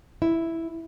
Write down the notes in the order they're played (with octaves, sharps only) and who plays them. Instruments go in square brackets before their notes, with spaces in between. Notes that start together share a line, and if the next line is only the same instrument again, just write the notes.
[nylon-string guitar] E4